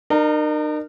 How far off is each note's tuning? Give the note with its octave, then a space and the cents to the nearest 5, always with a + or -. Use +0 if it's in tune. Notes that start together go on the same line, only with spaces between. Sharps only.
D#4 -45 A#4 +0